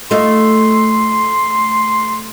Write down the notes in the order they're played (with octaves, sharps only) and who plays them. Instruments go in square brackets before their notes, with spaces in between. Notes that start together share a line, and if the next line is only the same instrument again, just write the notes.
[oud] A3 D#4 F4 [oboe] C6